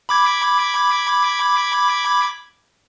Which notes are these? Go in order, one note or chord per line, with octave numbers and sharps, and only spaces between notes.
B5 D6 G#6